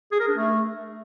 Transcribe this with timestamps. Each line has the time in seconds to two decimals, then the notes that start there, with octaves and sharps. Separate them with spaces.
0.12 G#4
0.20 A#4
0.28 D4
0.36 A3